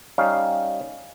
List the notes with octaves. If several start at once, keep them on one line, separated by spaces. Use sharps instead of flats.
G3 C#4 D#4 F5